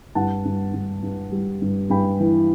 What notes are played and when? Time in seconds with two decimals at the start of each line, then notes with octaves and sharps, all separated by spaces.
0.15 G2 F#5 A5
0.45 G2
0.73 G2
1.03 G2
1.32 G3
1.62 G2
1.90 G2 G5 B5
2.20 E3